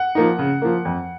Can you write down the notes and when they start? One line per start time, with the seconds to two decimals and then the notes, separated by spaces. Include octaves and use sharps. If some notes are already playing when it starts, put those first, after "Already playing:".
Already playing: F#5
0.15 F3 A#3 D#4
0.39 C#3
0.62 F3 A#3
0.85 F2